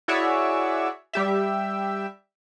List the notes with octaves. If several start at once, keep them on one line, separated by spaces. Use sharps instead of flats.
E4 F#4 G#4 C#5 D5 E5
G3 G4 E5